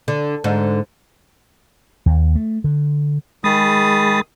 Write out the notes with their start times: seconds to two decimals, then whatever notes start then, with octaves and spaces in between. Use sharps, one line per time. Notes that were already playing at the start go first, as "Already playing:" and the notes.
0.08 D3
0.44 G#2 D3
2.06 D#2
2.35 A3
2.64 D3
3.44 D#3 G#3 G#4 B5 D#6 A6